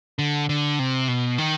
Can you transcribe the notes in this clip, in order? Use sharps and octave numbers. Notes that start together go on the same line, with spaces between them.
D3
D3
C3
B2
D#3